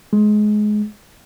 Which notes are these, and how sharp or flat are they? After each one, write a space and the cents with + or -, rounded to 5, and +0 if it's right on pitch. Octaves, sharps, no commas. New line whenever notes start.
G#3 +20